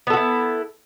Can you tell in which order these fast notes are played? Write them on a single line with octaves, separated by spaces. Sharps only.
B3 A4 F#4 E4